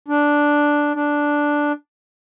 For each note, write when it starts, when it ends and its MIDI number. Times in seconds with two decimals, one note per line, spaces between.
0.08 0.93 62
0.95 1.72 62